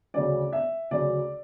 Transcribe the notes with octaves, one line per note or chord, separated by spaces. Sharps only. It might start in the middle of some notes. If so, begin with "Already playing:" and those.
D2 C#3 F#3 C#4 D5
E5
D2 C#3 F#3 C#4 D5